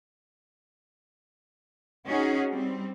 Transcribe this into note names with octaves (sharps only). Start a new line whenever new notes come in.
C#4 D#4 F#4 G#4
G3 C4